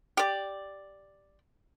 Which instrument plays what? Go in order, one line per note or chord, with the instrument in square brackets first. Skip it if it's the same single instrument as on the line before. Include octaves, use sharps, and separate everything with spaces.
[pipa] G4 D5